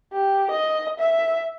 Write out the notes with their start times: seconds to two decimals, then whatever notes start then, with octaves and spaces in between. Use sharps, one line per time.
0.13 G4
0.51 D#5
0.99 E5